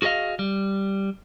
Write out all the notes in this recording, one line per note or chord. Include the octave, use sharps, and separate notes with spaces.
F#4 G#4 A#4 D#5 F5
G3